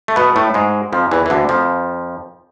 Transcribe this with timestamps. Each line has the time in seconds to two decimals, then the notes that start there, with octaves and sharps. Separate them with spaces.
0.08 A3
0.16 B2 B3
0.36 A2 A3
0.54 G#2 G#3
0.92 F2 F3
1.11 E2 E3
1.26 E3
1.30 D2 D3
1.49 F2 F3